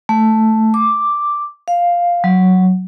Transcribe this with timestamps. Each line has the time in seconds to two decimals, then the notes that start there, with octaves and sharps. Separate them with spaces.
0.09 A3
0.74 D6
1.68 F5
2.24 F#3